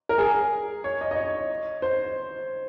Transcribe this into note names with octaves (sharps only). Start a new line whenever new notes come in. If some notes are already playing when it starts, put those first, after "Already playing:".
A#4
G#4
C#5
D#5
D#5
C#5
C5